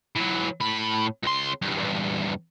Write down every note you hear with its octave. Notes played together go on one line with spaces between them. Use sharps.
E3 F#3
A2 B5
C#2 C6
E2 G2
E2 G2